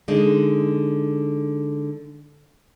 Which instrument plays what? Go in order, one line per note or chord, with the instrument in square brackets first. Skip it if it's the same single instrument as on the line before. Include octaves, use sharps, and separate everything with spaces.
[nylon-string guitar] D3 G#3 D#4